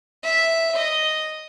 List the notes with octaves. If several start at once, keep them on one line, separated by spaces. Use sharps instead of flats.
E5
D#5